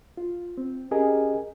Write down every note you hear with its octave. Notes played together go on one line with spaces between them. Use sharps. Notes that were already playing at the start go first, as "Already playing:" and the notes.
F4
C4
C#4 G4 G#4 A#4 D#5 G#5